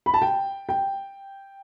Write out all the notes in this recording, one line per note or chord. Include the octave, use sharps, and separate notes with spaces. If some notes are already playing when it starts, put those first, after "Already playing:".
B5
A5
G5
G5